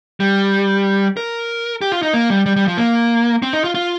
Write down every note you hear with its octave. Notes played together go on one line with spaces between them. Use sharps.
G3
A#4
G4
F4
D#4
A#3
G3
G3
G3
F3
A#3
C4
D#4
F4
F4